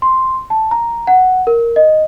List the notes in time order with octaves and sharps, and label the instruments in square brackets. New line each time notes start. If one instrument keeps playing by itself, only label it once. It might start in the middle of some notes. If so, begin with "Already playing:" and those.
[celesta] C6
A5
A#5
F#5
A#4
D#5